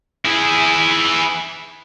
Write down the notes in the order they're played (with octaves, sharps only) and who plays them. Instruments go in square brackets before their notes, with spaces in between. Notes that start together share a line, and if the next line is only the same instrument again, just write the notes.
[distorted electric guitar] E4 G#4